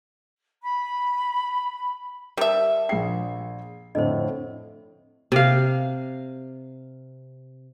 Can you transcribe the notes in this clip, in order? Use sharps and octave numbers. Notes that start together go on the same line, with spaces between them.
B5
G3 A#4 E5 A5
A#1 G#4 G5 C7
F2 A2 D3 C5 D#5
C3 F5